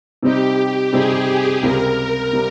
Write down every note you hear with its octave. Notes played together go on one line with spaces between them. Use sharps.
C3 G3 C4 D#4 G4
C3 G3 C4 D#4 G#4
C#2 C3 G3 A#4
C3 G3